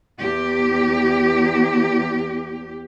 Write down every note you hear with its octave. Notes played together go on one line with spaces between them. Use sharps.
E2 G4